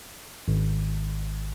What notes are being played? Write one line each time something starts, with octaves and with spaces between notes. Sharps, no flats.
G#1